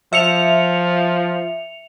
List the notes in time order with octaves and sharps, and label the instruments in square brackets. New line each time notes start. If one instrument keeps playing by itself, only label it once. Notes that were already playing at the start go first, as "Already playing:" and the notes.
[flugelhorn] F3 [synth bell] E5 C#7 F7